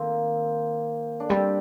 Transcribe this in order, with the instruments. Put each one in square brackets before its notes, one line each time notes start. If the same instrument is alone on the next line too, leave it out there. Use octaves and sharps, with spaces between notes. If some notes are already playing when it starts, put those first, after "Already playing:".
Already playing: [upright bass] D#3 [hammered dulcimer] A#3 C4
[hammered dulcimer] D4
[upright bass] G3 [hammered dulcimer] C4